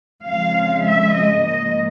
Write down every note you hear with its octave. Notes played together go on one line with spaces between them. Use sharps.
F2 C#3 F3 G#3 F5
E5
D#5
G#2 F3 A#3 D#5